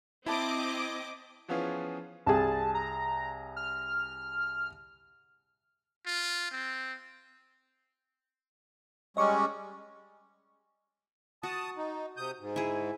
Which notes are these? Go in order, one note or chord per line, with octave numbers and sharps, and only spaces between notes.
C4 E4 D#5 A5 B5 D6
E3 F3 B3 C#4 F4 G#4
C2 G#4 A5
A#5
F6
F4
C4
G3 G#3 C#4 D#5 C#6 D6
F#4 A5 D#6
D#4
C3 D#6 G6
G#2
E4 G#4